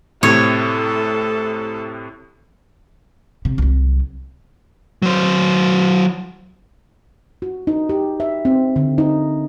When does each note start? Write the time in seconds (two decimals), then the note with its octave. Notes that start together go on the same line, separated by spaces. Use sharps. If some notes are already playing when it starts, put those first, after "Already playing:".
0.23 A2 C3 A4 C#5
3.45 C3
3.58 C2 F#3
5.02 F#3 C5
7.42 F#4
7.67 D#4
7.89 G4
8.20 E5
8.45 C4
8.76 D3
8.98 D#4